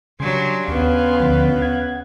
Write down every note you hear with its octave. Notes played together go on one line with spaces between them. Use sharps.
C#3 F#3 G3 D4 G#5 C6
D#2 C#3 B3 F5
D2 D3 F3
F#5 G#6